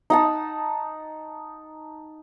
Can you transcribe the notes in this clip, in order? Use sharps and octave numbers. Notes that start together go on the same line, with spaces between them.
D#4 F#5 A5